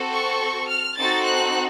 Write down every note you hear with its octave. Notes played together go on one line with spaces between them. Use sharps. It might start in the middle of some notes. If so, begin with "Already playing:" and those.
Already playing: C4 F#4 A4
C#6
F6
C4 D#4 F#4 A4 A6
F#6